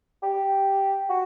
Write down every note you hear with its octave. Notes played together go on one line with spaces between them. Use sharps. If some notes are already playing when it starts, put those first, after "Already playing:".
G4
F#4